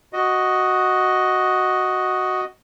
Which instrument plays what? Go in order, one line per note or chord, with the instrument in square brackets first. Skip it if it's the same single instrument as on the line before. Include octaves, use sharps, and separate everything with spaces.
[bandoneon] F#4 D#5